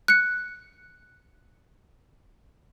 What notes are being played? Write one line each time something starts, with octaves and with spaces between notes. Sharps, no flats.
F#6 C#7